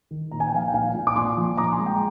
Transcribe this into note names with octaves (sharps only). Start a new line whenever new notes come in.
D#3
A#2 A#5
G#5
G5
F3 F5 G#5
G5
A#2 F5 G#5
A#2
D6
A#2 G#5 C6
F3
A#2 A#5 D6
G#5 C6
G#3
G5 A#5